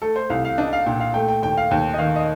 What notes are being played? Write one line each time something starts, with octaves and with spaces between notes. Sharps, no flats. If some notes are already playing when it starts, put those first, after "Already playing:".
A3 A4
C5
C2 F5
F5
D4 D#5
F5
A#2 G5
F5
A3 G5
G5
D#2 G5
F5
D#2 G5
D#5
D#3 F5
D#5